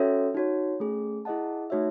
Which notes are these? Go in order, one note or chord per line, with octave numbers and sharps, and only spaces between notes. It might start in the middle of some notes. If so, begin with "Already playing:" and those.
Already playing: C#4 F#4 A4 C#5 E5
D#4 F#4 C#5
A3 C#4 G#4
E4 G#4 D#5 F#5 A5
A3 D#4 F#4 C#5 E5